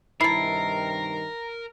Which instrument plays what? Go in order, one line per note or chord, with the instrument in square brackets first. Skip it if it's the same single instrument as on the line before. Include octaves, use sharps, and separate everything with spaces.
[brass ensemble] G2 C3 D#3 [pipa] E4 A4 [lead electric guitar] A#4 A#5 [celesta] C7